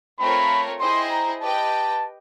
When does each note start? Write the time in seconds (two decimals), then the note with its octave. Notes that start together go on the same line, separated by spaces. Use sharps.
0.19 A3 C4 F4 A#4 C#5 B5
0.80 E4 G#4 C5 D#5 G5 C6
1.11 A#5
1.42 G4 B4 D#5 G5 A5